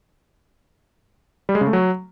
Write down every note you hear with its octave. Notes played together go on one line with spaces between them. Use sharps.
G3
G#3
C#3
A3
F#3